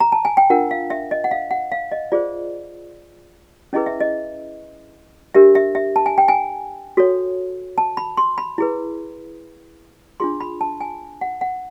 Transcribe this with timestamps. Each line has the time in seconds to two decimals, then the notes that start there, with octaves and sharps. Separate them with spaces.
0.00 A#5
0.12 A5
0.25 G#5
0.37 G5
0.50 D4 F4 A#4 F#5
0.71 F5
0.90 E5
1.11 D#5
1.24 F#5
1.31 F5
1.51 F#5
1.72 F5
1.92 D#5
2.12 F4 G#4 C5 D5
3.73 C#4 E4 G#4 B4 D#5
3.86 E5
4.00 D#5
5.34 D4 G4 A#4 E5
5.55 E5
5.75 E5
5.96 A5
6.06 G#5
6.18 G5
6.28 G#5
6.97 F#4 A4 C#5
7.78 A5
7.97 B5
8.17 C6
8.38 B5
8.58 E4 G#4 B4
10.20 D4 F4 G#4 C6
10.40 B5
10.61 A5
10.81 G#5
11.21 F#5
11.41 F#5